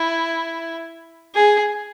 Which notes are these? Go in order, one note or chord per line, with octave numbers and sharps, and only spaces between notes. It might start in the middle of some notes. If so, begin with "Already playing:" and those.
Already playing: E4
G#4